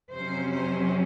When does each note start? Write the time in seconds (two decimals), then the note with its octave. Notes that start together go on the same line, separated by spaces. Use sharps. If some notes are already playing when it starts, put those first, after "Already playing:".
0.11 F2 C3 F#3 C#4 C5
0.51 C5